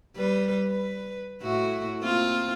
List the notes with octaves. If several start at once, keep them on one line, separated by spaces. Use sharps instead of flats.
G3 B4
B4
A2 E4 F#4
A#3 C4 F4